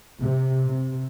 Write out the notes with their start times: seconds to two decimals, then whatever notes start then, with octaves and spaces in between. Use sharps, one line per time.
0.20 C3
0.66 C3